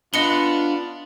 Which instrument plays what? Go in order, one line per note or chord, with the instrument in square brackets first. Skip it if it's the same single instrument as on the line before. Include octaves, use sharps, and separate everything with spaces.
[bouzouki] B3 [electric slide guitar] D4 [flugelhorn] F4 [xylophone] D#5 C#7 G7